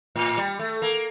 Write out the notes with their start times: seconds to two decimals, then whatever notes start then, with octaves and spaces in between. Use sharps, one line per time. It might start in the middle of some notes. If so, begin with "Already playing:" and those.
0.16 A2
0.37 G3
0.59 A3
0.82 A#3